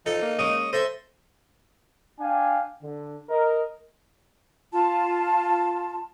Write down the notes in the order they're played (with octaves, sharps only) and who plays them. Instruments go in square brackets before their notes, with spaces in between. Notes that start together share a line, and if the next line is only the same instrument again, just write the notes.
[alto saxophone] F3 [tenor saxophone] D#4 [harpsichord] A4
[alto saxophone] A#3
[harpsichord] G#3 C#4 [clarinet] D#6
[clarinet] A4 [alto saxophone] C5 [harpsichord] D#5 E5
[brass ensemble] D4 F5 G5 G#5
D3
A#4 D#5
[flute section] F4 A5